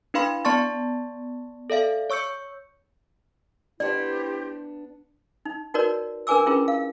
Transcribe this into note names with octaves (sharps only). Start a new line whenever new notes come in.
D4 E4 B4 F5 B5 C6
B3 D5 A5 C6 C#6 A6
A4 D5 E5 F5
C#5 C#6 E6 G6 C#7
B3 D4 E4 G4 C5 D5
D#4
D#4 F#4 A#4 B4 C#5 D5
D4 A#4 B4 G#5 D6 E6
C#4 E4 F4 G#4 A#4 B4
F5